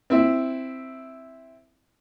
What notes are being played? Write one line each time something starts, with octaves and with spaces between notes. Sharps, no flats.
C4 E4